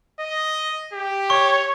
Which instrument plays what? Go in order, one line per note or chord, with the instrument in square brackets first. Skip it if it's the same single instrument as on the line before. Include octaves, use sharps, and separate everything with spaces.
[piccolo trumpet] D#5
G4
[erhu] C#5 [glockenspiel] C#6